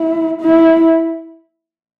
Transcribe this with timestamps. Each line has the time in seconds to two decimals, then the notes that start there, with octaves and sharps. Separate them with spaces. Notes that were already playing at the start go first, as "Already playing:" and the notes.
Already playing: E4
0.41 E4